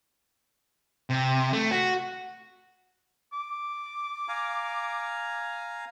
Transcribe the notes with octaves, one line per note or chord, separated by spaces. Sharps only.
C3
A3
F#4
D6
F5 G#5 A#5